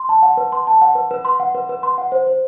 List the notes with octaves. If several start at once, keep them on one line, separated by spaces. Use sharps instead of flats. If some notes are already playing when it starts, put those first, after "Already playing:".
Already playing: C6
A5
F#5
B4
C6
A5
F#5
B4
B4
C6
F#5
B4
B4
C6
F#5
C5
C5